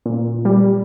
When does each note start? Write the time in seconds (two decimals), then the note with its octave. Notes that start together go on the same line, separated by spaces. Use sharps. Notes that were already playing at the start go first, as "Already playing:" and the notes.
0.06 A#2
0.45 G3